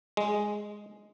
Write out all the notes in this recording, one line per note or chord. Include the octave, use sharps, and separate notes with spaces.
G#3